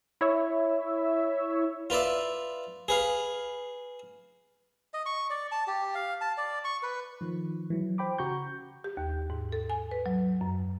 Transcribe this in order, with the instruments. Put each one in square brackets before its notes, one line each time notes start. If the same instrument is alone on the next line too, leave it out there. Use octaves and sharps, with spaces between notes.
[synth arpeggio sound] E4 C#5 E5
[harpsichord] F4 B4 D5 E5
G#4 B4 F5
[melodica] D#5
C#6
D5
A5
G4
F5
A5
D5
C#6
B4
[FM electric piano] D#3 F3
E3 F#3
C5 G5 B5 D6
C#3 F#4 A#5 C#6 G6
[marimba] G4
D#2
G#2
A4
G#5
B4
F#3
F#2